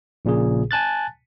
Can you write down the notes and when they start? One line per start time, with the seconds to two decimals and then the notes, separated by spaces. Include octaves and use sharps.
0.25 A#1 A#2 C#3 G#4
0.71 G#5 A5 F#6 A6